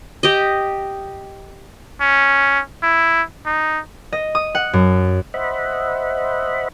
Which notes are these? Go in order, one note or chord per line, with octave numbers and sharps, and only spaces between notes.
G4 D#5
C#4
E4
D#4
D#5
D#6
F#5
F#2
C5 D#5 E5 F#5 B5